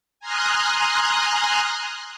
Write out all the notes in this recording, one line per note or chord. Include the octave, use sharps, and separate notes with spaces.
G#5 A#5 C6 D#6 F6 F#6